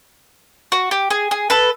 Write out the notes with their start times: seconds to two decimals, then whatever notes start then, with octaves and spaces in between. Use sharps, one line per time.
0.72 F#4
0.91 G4
1.10 G#4
1.31 G#4
1.50 A4 B4